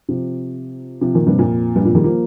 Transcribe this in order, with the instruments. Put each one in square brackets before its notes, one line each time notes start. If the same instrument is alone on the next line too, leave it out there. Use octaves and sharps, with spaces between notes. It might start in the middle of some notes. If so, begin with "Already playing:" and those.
[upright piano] C3 F3
C3 F3
A#2 D#3
G2 C3
F2 A#2
G2
F2 A#2
D#3 G3
F3 A#3